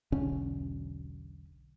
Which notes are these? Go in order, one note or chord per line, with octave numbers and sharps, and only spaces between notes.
E1 B1 D3 C#4